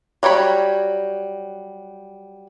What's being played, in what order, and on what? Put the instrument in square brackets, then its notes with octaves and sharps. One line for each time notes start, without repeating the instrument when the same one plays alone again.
[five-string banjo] F#3 G3 C#5 B5